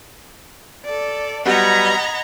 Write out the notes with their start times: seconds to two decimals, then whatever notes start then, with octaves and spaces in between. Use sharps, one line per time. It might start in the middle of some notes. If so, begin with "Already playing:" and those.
0.85 A4 D5
1.45 F#3 G3 B3 D#5 F#5 A#5 B5 G#6